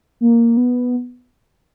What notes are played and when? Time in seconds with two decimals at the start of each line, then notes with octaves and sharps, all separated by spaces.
0.21 A#3
0.57 B3